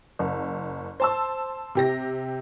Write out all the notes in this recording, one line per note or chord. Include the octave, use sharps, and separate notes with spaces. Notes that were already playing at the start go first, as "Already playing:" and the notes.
F#1
C5 A5 E6
C3 G4 A#6